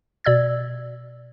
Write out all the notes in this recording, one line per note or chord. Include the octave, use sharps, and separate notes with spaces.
B2 D5 E6 G#6